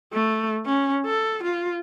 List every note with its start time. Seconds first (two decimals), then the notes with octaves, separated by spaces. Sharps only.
0.13 A3
0.66 C#4
1.06 A4
1.43 F4